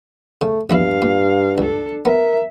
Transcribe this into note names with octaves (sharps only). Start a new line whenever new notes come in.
C#3 A3
A#1 E2 G2 E4 F5
A#2
C#2 D4 A4
B3 A#4 E5